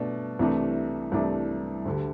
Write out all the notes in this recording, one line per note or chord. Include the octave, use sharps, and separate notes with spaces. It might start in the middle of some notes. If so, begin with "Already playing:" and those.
Already playing: B2 A3 D4
C2 C3 E3 A3 D4
C2 C3 E3 A3 D4
D2 D3 G3